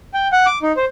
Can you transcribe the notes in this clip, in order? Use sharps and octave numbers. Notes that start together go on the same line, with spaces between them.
G5
F#5
D6
D#4
C5